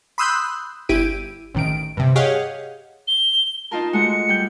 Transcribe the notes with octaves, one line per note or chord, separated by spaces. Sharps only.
B5 C6 D#6 E6 F#6 G6
G1 E4 G4 D7 D#7
A1 D#3 D7
G2 C3
G4 G#4 C#5 D#5 F5 F#5
G7
D#4 F4 A#4 A5
G#3 A3 F#4 C#7
G3 G6